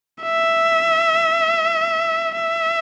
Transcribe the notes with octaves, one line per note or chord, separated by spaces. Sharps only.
E5
E5